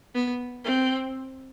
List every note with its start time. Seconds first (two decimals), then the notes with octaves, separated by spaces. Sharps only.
0.15 B3
0.65 C4